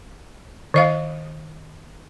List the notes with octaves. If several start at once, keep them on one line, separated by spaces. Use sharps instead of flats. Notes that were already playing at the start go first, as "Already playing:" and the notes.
D#3 D#5 F5